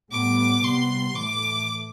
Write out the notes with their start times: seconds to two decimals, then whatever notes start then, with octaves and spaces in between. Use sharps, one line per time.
0.12 A2 G3 B3 D6
0.63 C3 G3 B3 C6
1.16 A2 E3 A3 D6